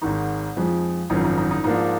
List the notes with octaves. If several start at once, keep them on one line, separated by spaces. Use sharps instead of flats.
G#1 G#2 D#3 D#4
F2 F3 G#3
G#1 F#2 F3 D#4
D#4
D#4
D#4
G#2 F3 A#3 D4 D#4